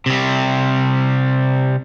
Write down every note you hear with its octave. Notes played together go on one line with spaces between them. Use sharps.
C3 G3